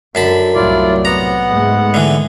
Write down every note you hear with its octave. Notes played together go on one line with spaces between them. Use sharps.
F#2 D3 A5 B5
C2 A2 F#3 E4 F4 D5
B3 F#5 A#5
G#2 G#3 A3
D3 E3